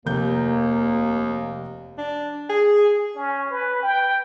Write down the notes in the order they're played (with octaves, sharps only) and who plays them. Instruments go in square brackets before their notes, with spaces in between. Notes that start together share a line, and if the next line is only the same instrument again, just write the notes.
[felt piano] F1 G6 [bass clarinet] D#2 [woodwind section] A#3
[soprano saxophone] D4
G#4
[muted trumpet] C#4
B4
G5